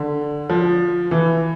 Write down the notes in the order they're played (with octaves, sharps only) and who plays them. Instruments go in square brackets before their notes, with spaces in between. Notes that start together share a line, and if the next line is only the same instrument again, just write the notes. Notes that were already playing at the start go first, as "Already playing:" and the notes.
Already playing: [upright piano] D3
F3
E3